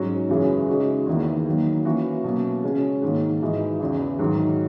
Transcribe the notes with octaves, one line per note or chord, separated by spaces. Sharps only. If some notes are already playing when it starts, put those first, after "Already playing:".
Already playing: G#2 F#3 C#4 F#4
F#2 C#3 E3 G#3 C#4
C#3 G#3 D#4 F#4
E2 D#3 A#3 E4
D#3 F#3 A#3
E3 A#3 C#4 F#4
B2 F#3 A#3 C#4
C#3 G#3 C#4 F#4
G#2 D#3 A#3
G#2 E3 G#3 D#4 F#4
E2 C#3 E3
G#2 D#3 F#3